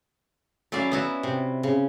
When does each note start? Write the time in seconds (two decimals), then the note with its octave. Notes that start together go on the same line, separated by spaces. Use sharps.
0.72 F#3 C#4 E4 D5 F5
0.92 B3 E4 F#4
1.23 C3
1.63 C#3